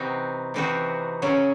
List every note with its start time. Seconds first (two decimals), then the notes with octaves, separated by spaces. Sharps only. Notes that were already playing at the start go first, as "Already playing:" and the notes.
Already playing: C3 E3 C4 D#4 F#4
0.54 C3 E3 C4 D#4 F#4
1.22 C#3 F#3 C#4